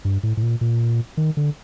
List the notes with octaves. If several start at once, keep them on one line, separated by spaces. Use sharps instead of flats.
G2
A2
A2
A#2
A#2
D#3
D3